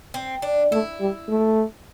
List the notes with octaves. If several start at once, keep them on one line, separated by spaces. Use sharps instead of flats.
C4
D4
A3 E4
G3
A3